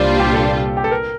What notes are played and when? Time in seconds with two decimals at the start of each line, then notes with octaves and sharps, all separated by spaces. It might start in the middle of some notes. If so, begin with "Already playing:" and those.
Already playing: C2 A#2 G3 D4 F4 C5 D5
0.20 G4
0.34 A4
0.77 G4
0.84 A4
0.91 A#4